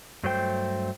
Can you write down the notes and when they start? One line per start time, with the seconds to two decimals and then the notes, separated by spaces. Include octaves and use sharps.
0.23 G2 F#3 A3 C5 G5